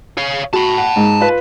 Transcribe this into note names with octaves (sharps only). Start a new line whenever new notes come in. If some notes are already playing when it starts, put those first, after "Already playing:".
C#5 F5
F#4 A5 B5
F#5
G#2
F4 B4